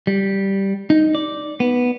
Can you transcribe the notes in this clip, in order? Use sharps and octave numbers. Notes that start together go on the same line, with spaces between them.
G3
D#4
D5
B3